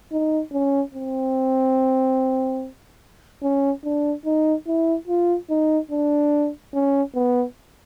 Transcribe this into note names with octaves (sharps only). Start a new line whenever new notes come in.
D#4
C#4
C4
C#4
D4
D#4
E4
F4
D#4
D4
C#4
B3